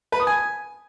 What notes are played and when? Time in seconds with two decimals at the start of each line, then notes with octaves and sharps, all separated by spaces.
0.12 B4
0.20 D#6
0.27 G#5